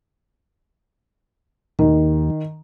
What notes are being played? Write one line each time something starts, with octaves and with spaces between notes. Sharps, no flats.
D#2 D#3